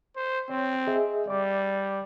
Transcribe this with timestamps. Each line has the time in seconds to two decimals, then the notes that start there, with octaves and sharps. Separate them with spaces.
0.16 C5
0.50 C4 C#5
0.87 G#4 D#5 E5
1.27 G3 D5 D6